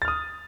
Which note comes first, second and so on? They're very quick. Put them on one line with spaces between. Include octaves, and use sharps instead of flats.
A6 F6 D#6